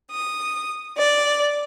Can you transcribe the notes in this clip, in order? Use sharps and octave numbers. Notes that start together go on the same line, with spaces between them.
D#6
D5